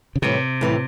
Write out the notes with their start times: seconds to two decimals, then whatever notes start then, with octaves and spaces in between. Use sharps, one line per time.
0.16 C#3
0.22 A2 C3 E3 G3
0.61 A2 E3 G3